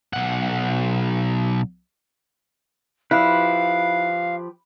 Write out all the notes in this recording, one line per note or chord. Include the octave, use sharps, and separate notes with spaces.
B1 F#5
F3 E4 G4 B4 F5